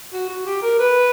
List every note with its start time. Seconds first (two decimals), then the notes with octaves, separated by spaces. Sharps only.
0.13 F#4
0.29 F#4
0.46 G4
0.62 A#4
0.79 B4